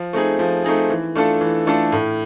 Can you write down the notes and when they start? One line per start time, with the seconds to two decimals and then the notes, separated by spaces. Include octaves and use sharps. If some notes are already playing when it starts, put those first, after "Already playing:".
Already playing: F3
0.13 A3 C4 D#4 G#4
0.39 F3
0.64 A3 C4 D#4 G#4
0.90 E3
1.15 A3 D4 F4 A4
1.41 E3
1.67 A3 D4 F4 A4
1.92 A2